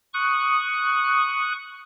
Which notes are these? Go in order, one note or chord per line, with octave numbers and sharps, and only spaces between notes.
C#6 D#6 F#6